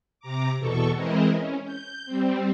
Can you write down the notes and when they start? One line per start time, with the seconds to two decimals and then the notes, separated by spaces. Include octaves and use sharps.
0.20 C3 A#5 D6
0.58 E2 B2 A4 C#6
0.94 E3 G#3 C4 E4 A#4 D#5
1.33 C#4
1.64 G6
2.06 G3 C4